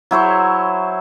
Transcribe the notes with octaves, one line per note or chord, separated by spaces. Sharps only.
F#3 E4 C5 C#5